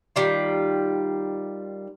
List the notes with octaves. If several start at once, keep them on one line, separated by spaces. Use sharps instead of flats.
D#3 G3 F4